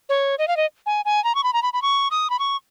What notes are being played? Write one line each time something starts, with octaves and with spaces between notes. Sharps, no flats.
C#5
D#5
F5
D#5
G#5
G#5
A#5
C#6
B5
A#5
B5
B5
C#6
D#6
B5
C#6